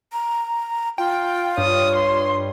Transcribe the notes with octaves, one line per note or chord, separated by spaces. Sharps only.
A#5
F4 G5
G2 C#5 D#6
C6